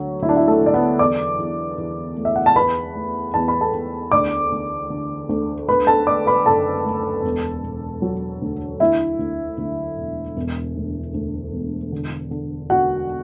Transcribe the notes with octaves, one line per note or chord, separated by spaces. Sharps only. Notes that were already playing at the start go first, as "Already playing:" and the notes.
Already playing: D2 D3 F#3
D2 E4
D4
E4
A3 A4
D3
D5
B3 B4
E2 D5 D6
E2
E2
A3
E5
F#5
A5
E2 B4 B5
A3
E2 A5
B5
A4 A5
E2
D2 D5 D6
D2
D3
D2
A3 B4 B5
A4 A5
A3 D5 D6
B4 B5
F#1 A4 A5
A3
E1
E1
F#3
D2
D2 E4 E5
D2
D2
E1
E1
D2
D2
E1
D3
D3
D3 F#4 F#5